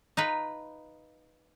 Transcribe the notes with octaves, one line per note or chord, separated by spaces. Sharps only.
D#4 F4 B4